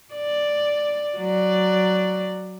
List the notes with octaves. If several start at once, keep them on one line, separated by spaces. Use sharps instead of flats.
D5
F#3 D5